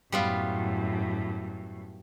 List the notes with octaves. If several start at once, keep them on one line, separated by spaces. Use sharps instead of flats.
F#2 A2 G3 B3 F4